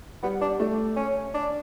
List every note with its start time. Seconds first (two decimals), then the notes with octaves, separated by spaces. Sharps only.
0.23 G3 B3
0.41 D4
0.60 A3
0.96 C#4
1.34 D4